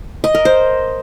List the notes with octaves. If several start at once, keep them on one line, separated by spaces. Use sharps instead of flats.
D#5
A#4
C5